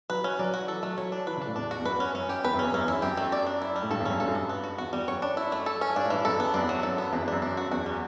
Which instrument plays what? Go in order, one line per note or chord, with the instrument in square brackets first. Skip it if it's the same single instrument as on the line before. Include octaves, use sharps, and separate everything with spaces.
[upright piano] F#3 [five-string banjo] B4
[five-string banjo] C#4
[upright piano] F#3 [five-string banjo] D5
[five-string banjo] F#4
[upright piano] E3 [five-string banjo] A4
[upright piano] F#3 [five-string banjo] A3
[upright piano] F#3 [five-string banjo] C#5
[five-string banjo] D4
[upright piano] E3 [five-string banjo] B4
[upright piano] C#3
[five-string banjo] D4
[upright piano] A2
[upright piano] E2 [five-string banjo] D4
[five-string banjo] F#4
[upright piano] E2
[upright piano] F#2 [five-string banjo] B4
[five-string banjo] C#4
[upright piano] F#2 [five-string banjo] C#4
[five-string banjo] G4
[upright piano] E2 [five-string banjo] B4
[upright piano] F#2
[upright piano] E2 [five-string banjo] C#4
[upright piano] F#2 [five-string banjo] C#4
[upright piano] E2 [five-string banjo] E4
[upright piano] F#2 [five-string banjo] G4
[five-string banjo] A3
D5
D4
E4
G3
[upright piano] A2
[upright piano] G2 [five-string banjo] A4
[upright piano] E2
[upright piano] F#2 [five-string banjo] C#4
[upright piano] G2 [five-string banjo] A4
[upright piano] F#2
[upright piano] G2 [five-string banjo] B3
[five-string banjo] B3
F#4
[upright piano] E2 [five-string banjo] F#4
[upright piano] E2 [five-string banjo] G3
[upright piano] F#2 [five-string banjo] C#5
[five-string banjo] D4
E4
A3
A4
C#4
[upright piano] G2 [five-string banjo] D4
[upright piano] A2
[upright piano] G2 [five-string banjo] E3
[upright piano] F#2 [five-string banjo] A4
[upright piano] E2 [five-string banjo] B3
[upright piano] F#2 [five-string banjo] D4
[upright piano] E2
[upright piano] F#2 [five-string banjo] F#3
[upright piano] F#2 [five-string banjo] A4
[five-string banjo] B3
[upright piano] E2 [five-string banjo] B4
[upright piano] E2
[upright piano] F#2 [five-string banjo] D4
[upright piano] F#2 [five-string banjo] D4
[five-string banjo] F#4
[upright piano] E2 [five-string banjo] F#4
[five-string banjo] G3